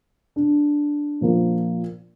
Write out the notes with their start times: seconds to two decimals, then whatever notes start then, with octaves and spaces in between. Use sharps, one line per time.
0.36 D4
1.21 A#2 F3 A#3